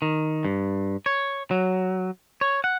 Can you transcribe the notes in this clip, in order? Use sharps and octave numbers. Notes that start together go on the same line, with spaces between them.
D#3
G2
C#5
F#3
C#5
F#5